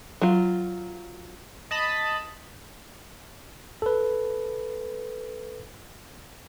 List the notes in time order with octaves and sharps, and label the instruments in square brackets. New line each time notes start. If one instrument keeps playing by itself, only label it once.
[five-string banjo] F#3 F4
[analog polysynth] D#5 A5 B5
[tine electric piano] A4 B4